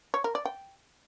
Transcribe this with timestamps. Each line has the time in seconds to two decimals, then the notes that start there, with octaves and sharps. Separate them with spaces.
0.14 C#5
0.24 A#4
0.35 D5
0.45 G5